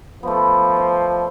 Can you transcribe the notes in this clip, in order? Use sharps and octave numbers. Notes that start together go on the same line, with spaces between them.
F3 A3 B3
C5 D5